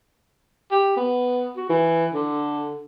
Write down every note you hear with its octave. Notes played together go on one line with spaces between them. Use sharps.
G4
B3
F#4
E3
D3